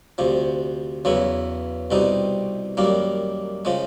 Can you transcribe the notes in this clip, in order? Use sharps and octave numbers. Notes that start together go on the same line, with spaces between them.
D2 C3 F3
E2 C#3 F#3 B3 E4
C2 B2 G3 C4 D#4
F#2 D#3 G3 A#3
C#3 F3 G#3